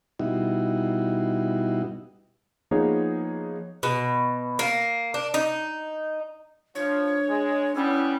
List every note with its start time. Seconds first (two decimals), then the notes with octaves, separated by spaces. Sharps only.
0.19 B2 G3 D#4 E4 F#4
2.71 F3 A#3 B3 D#4 G#4 C#5
3.83 B2
4.59 A#3
5.14 D4
5.34 D#4
6.75 F3 D4 C#5
7.28 G#3
7.75 G3 B3 C#4 E4 E6